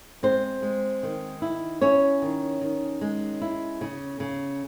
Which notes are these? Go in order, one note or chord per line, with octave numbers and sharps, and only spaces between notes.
G#3 C4 C5
G#3
D#3
E4
C#4 E4 C#5
D#3
D#3
G#3
E4
C#3
C#3